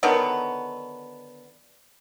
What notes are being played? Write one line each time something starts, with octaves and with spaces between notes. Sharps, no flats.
D3 D#3 F#3 B3